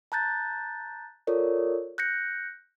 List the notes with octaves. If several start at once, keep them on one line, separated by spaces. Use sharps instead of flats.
A5 A#5 F#6 G6 A6
F4 A4 A#4 C#5 D5
F#6 G6 A#6 C#7